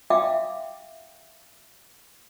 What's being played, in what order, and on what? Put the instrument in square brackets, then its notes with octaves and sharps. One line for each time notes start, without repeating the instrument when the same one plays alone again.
[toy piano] E5 F5 G5 D6